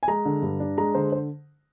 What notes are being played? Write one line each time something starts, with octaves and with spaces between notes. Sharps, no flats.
G#5
G#3 A#5
D3
G2
D4
G#3 A#5
D3 C5
C5